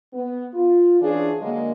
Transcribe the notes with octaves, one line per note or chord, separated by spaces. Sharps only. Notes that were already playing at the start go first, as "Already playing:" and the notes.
B3
F4
E3 C#4 D4 F4 G#4
D3 F#3 G#3 A#3